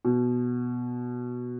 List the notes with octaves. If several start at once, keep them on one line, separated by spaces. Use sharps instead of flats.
B2